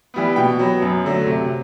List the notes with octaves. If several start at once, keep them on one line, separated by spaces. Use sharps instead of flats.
E3 G3 B3
B2 G5
F#3 B3
F#2
D3 F#3 A3
C3